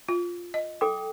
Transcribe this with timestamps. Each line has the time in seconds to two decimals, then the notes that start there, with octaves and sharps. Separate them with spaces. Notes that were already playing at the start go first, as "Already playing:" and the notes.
0.08 F4
0.54 D#5
0.81 A4 G5 D6